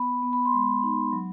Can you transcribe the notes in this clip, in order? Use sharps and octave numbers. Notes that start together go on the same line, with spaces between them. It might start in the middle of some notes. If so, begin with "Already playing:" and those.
Already playing: B3 B5
B3
B5
C6
G#3 B5
D#4
F#3